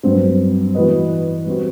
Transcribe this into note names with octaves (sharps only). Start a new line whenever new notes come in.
G2 F#3 C4
E3 B3 F#4 B4 D#5
G3 C4 F#4